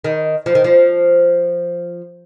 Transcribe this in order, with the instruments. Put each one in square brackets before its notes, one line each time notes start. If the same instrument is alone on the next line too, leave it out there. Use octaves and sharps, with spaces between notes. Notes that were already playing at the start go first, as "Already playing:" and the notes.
[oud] D#3
F3
D#3
F3